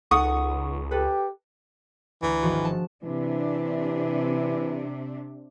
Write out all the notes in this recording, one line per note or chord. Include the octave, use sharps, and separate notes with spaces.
C#2 D#4 A4 F#5 C#6 D#6
G4 A4 B4
D2 E3 A#5
G#1 F3 F#4
A5
C3 E3 D4